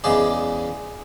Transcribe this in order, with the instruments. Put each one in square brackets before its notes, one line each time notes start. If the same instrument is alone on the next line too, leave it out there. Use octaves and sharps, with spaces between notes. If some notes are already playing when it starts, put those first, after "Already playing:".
[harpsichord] E2 C#3 G#3 D4 G#4